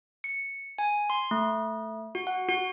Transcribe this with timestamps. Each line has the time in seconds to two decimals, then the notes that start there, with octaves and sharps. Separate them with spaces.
0.24 C#7
0.79 G#5
1.10 C6
1.31 A3
2.15 F#4
2.27 F#5
2.49 F#4